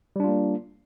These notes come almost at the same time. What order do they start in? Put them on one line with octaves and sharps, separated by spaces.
G3 D4 F4 A#3